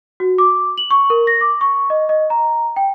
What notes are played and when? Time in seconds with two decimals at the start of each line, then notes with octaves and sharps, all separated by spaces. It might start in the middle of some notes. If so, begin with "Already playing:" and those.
0.20 F#4
0.38 D6
0.78 F#7
0.91 C#6
1.10 A#4
1.27 A#6
1.41 D6
1.61 C#6
1.90 D#5
2.09 D#5
2.30 A#5
2.76 G5